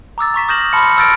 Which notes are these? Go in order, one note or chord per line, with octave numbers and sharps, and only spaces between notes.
A#5 D6 E6 A6
A#5 C#6 B6 E7
D#6 F6 G6 A#6 E7 F#7
A5 B5 C6 F6 C#7
E6 F6 G6 A6 A#6 D7